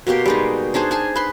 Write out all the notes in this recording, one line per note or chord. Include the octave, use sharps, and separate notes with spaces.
B2 A#3 G4 C6
G3 G#3 D#4
D4 D#4 G#4 C5
G#4 G#5 A5
B4 C6